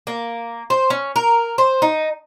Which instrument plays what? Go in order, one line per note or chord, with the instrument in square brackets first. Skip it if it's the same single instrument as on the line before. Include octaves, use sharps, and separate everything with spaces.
[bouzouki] A#3
C5
C#4
A#4
C5
D#4